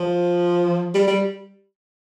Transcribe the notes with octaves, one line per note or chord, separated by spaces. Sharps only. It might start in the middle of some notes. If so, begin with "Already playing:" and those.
Already playing: F3
G3
G3